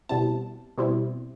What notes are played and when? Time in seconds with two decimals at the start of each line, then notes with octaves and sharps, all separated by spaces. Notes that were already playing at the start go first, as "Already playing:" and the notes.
0.09 B2 G3 C4 E4 A5
0.78 B2 G3 C4 E4